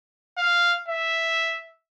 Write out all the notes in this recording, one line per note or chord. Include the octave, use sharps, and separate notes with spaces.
F5
E5